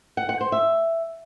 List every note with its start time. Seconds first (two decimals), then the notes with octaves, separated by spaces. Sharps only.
0.17 F#5
0.29 F#5
0.41 C5
0.52 E5